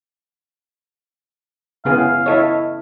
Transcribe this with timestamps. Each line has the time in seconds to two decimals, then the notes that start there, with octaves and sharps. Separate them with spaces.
1.85 C#3 B3 C#4 E4 G#4 F5
2.26 E4 A4 C#5 D#5